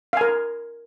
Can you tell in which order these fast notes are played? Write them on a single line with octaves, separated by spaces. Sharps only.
F5 G#5 A#4